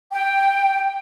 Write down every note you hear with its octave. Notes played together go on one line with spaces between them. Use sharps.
G5